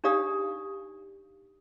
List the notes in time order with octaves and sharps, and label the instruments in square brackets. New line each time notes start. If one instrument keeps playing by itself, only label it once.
[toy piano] D4 D#4 G4 D5 F5 D#6